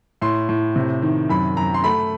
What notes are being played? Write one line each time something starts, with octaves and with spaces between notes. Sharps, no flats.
A2 C6
A2
C3
D#3
F#2 B5
F#2 A#5
C6
A3 B5